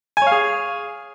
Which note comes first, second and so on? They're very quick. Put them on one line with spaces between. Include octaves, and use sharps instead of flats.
G#5 C#5 F5 G#4